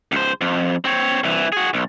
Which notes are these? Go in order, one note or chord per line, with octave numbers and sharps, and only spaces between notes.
C#2 C5
F2
C4 C#5
C2 E3
F#4 G#4
B1